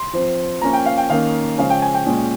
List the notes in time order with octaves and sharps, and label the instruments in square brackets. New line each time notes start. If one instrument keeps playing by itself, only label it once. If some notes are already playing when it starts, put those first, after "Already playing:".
Already playing: [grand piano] C6
F3 C4
F3 A#3 C#4 A#5
G5
F5
G5
D#3 A#3 C#4 F5
C#3 F3 G#3 C#4 F5
G5
G#5
G5
A#2 G#3 C#4